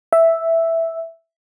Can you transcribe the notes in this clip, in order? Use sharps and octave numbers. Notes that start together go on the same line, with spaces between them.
E5